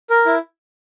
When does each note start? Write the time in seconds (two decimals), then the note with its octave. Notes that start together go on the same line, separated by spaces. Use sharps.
0.10 A#4
0.26 E4